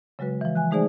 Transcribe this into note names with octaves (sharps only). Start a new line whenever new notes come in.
C#3 F#3 G#3 F#4 B4
E3 F3
G#5 F#6
G#3 A3 D#4 G#4 C5 D5